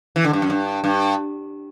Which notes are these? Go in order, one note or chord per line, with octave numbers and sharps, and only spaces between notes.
E3
D3
G2
F#2
G2
G2